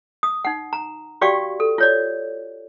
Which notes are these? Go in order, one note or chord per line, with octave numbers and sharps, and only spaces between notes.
D#6
D#4 F#5
A#5
F#4 G4 D5 F5 G5 C#6
A4
F4 C#5 D5